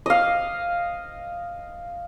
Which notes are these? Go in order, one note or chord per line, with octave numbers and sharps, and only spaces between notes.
D#5 F5